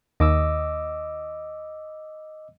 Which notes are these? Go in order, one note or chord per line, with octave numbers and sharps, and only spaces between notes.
D#2 D#5 D6 E6